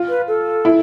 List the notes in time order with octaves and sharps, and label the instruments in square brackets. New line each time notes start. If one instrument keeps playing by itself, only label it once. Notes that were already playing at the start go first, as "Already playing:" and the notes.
Already playing: [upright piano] F4
[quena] B4
A4
[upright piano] E4